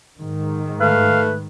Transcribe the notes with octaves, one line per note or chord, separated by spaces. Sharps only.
G#2 D#3
A3 B4 F5